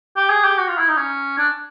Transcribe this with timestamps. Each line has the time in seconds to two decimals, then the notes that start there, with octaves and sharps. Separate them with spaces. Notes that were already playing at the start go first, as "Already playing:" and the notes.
0.16 G4
0.30 G#4
0.44 G4
0.58 F#4
0.68 F4
0.78 E4
0.88 D#4
0.97 C#4
1.38 D4